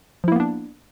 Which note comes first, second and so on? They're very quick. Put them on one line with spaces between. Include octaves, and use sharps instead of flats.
F3 E4 A#3 B3 D4